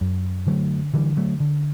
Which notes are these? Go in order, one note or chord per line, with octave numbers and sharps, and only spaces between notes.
F#2
D3 F#3 A3
D3 E3 G3
F#3 A3
D3